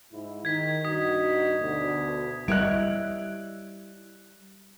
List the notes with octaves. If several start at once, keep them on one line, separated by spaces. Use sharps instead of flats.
G#2 E4
D#3 G#6 B6
G2 D#4 F#4 D#6 B6
D2 B2
G3 E4 C#5 D#5 F#6 D7